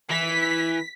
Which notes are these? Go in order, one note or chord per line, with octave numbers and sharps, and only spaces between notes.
E3 B6